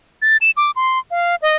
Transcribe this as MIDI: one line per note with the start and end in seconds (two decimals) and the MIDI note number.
0.22 0.37 93
0.41 0.51 100
0.57 0.71 86
0.76 0.99 84
1.11 1.35 77
1.42 1.57 75